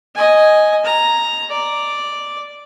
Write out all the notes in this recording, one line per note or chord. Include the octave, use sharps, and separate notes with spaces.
D#5 G#5
A#5
D5